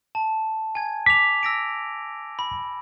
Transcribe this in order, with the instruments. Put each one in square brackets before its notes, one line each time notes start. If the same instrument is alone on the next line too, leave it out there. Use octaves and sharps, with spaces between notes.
[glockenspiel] A5
G#5 G#6
[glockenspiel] D6 F7 [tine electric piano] B6
[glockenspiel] E6 A#6 D7
B5